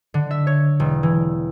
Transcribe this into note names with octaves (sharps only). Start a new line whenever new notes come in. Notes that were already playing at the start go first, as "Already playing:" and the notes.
D3
E5
C#5
E1
E3